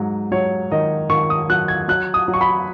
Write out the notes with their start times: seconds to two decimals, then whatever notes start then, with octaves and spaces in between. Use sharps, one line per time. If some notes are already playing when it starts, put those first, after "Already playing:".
Already playing: G#2 F#3
0.31 F#3 C#5
0.71 D#3 D#5
1.10 D#3 C#6
1.30 D#6
1.50 F#3 F#6
1.68 G#6
1.88 F#3 F#6
2.14 D#6
2.28 F#3
2.34 C#6
2.41 B5